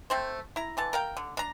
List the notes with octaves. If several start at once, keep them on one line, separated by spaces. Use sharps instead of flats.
A3 C4 C5
E4 A#5
D3 E3 A5
A#4 F5 G5
D3
D4 A#5